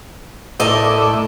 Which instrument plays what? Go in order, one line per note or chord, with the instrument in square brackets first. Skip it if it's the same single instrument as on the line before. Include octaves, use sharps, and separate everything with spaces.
[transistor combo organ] A2 E4 D5 [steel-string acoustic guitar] A4 A#4 D#5